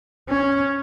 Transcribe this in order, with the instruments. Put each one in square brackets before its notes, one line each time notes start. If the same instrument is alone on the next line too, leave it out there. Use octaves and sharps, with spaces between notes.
[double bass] C#4